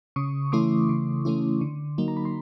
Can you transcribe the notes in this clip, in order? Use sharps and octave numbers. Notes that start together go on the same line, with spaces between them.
C#3 C#6 D#6
E3 A3 C#4 E4 C6 D6
C#3
E3 A3 C#4 E4
D3
F#3 A#3 D#4
A#5
B5
C6